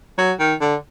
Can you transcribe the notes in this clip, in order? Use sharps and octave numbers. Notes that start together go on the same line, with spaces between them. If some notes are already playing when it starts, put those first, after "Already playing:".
F#3
D#3
D3